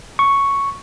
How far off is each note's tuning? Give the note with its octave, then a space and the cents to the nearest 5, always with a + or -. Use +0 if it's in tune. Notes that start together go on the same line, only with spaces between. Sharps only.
C#6 +0